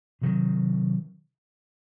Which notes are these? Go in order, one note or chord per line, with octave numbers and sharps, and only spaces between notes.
C3 D#3 F#3